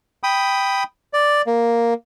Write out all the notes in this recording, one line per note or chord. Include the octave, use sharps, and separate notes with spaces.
G5 B5 D#6
D5
A#3